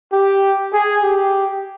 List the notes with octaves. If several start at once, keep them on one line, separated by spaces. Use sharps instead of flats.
G4
G#4
G4